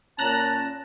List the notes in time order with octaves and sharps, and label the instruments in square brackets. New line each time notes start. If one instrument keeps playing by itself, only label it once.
[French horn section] A#2 C#4 [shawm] A5 [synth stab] A#5 F#6 A#6